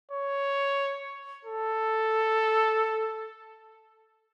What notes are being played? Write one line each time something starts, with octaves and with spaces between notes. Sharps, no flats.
C#5
A4